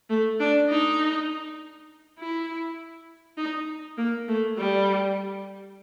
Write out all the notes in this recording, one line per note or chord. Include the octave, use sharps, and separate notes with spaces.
A3
D4
D#4
E4
D#4
A#3
A3
G3